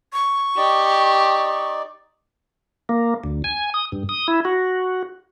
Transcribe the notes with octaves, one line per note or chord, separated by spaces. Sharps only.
C#6
D#4 G4 D5
A#3
D2
G#5
D#6
G2
D#6
E4
F#4